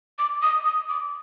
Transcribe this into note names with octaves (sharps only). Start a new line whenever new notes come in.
D6
D#6
D#6
D6